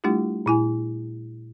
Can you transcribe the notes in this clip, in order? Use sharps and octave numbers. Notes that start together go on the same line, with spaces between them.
G3 A3 D4 E4 F4 G4
A#2 E4 G#5